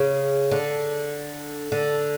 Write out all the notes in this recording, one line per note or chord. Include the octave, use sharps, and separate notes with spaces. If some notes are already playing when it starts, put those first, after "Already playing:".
Already playing: C#3
D3
D3